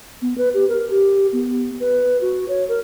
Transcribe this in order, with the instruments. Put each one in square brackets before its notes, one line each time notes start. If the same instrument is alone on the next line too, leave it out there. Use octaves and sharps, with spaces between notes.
[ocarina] B3
B4
G4
A#4
G4
B3
B4
F#4
C#5
A#4